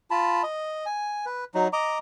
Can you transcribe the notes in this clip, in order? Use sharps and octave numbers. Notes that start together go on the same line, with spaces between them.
F4 A5 B5
D#5
G#5
B4
F#3 D#4
D#5 A#5 D6